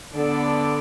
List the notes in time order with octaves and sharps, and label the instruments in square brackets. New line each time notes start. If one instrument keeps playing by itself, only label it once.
[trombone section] D3 [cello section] B3 D4 A4 D5